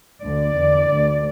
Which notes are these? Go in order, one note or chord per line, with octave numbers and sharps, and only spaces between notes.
D2 D3 D5
E2 D3
D2 D3